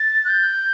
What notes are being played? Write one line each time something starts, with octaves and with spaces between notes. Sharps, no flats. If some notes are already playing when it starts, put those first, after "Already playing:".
Already playing: A6
F#6
G6